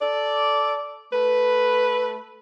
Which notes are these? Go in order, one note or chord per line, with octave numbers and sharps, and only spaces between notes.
A4 D5
A3 B4